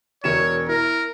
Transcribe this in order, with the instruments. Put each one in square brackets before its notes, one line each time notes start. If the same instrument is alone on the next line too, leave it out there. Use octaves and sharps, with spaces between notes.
[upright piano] E1 A#4 E7 [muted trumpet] C#5
[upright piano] E4 [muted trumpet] A#4